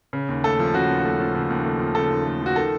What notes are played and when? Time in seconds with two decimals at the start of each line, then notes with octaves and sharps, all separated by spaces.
0.13 C#3
0.29 D#2
0.44 A3 A4
0.59 F3
0.74 C#3 F#4
0.89 D#2
1.05 A3
1.20 F3
1.35 C#3
1.50 D#2
1.64 A3
1.80 F3
1.95 C#3 A4
2.10 D#2
2.25 A3
2.41 F3 F#4
2.56 D#3 A4